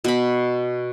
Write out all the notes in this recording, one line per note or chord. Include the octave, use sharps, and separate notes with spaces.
B2 B5